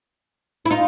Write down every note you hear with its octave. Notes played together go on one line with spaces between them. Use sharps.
E4
D#4 F4